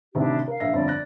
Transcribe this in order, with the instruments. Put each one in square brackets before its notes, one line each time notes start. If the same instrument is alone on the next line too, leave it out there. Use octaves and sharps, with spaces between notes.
[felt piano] A1 C3 D#3 [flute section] D4 E4 G4
[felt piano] A#4 [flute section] F5
[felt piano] A#1 E5 A#6
[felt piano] G1 F2 [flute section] D5
[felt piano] F#6 A#6